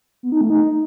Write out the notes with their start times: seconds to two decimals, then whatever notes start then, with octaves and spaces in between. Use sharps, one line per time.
0.23 B3
0.32 D#4
0.41 A3
0.50 D#4